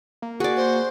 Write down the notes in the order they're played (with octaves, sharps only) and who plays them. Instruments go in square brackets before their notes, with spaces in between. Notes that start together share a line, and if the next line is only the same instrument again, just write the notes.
[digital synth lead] A#3
[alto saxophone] F#4 [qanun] G#4 D5
[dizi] C5